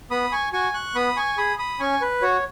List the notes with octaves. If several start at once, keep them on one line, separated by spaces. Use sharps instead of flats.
B3 B5 D#6
G#5 C#6
F#4 G#5 C#6
C#6 F#6
B3 B5 D#6
G#5 C#6
G#4 B5 D#6
B5 D#6
C#4 G#5 C#6
B4
F#4 C#5